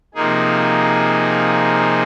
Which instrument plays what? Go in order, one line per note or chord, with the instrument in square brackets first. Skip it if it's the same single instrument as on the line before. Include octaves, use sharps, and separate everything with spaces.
[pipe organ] C3 F3 A#3 D#4 G#4